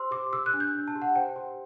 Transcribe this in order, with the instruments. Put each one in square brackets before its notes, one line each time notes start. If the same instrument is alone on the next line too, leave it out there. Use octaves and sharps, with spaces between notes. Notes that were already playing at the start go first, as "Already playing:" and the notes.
Already playing: [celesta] G4 C5 C6 E6
G4 D6
G4 E6
F#6
D4
G6
D4
A5
G4
F#5
C5 G5
G4